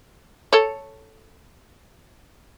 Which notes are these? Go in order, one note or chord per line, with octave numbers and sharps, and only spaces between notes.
A4 C#5